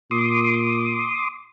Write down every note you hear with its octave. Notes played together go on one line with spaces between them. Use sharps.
A#2 C6 D6 D#6